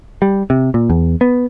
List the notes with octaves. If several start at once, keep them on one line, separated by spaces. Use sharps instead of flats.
G3
C3
A#2
E2
B3